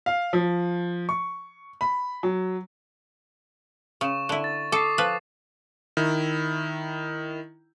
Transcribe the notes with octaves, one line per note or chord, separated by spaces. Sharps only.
F5
F3
C#6
B5
F#3
C#3 C#6 E7
D3 E4
A6
A4 D6 D#6 C7
F3 B4
D#3 E4